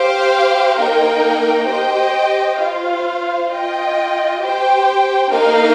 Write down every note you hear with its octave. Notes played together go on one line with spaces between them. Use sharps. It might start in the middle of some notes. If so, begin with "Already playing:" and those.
Already playing: G4 C5 F5
A#3 D#4 A#4 G5
G4 C5 D#5 G5
F4 C5 F5
F4 D#5 G5
G4 C5 G5
A#3 D#4 A#4 F5